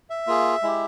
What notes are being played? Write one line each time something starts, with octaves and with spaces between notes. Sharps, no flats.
E5
A#3 F4 G#4
G#3 E4 G4